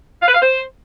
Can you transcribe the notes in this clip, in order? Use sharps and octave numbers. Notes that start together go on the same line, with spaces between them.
F5
B4
F5
C5